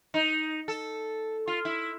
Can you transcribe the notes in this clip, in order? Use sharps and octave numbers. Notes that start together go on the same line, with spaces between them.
D#4
A4
F4
E4